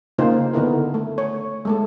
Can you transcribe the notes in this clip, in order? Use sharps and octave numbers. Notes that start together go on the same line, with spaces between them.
C#3 A#3 D#4 F4 C5
D3 B3 D#4 E4 A#4
A3
C#5
G#3 A3 A4